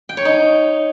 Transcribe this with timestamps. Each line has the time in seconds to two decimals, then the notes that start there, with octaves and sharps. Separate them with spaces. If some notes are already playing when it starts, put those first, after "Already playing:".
0.09 G5
0.17 C#5
0.25 D#4